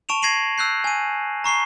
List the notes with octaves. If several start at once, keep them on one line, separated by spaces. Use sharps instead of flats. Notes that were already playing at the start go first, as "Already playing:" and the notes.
A5 C#6 D7 E7 F7
G#6 A#6 C7 D#7 F#7
E6 F#6 G6 C7
G#5 D#7
A#5 C#6 C7 G7